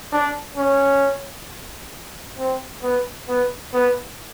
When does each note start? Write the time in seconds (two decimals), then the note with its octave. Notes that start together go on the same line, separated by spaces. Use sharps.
0.13 D4
0.57 C#4
2.38 C4
2.83 B3
3.28 B3
3.74 B3